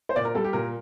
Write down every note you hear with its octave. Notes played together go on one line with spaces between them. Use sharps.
C5
A#2 D5
A#4
G3 A4
G4
A#2 A#4